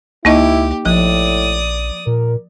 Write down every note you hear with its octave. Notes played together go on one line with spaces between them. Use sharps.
C#2 A#3 D#4 E4 G4 D#5
A#1 A2 F3 D5 D#6
A#2 A#4